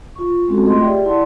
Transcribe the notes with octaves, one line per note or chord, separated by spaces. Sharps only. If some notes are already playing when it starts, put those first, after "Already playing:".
F4 C#6
G#3 C4 C#4 F#4 A4
A3 F4 G#4 D#5 C6
G4 G#4 D5 E5 G5
E4 D5 F#5 A5 C6